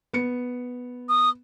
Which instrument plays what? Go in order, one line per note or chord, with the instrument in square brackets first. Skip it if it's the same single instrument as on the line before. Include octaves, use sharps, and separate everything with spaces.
[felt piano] B3 C#7
[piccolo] D#6